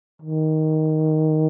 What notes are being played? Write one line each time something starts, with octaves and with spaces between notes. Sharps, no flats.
D#3